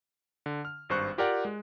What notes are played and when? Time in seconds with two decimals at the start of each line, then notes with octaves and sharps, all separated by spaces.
0.46 D3
0.65 F6
0.89 G#1 G2 C5 C#6 F#6
1.18 F4 G4 A#4 D5 F#5 G5
1.45 G#3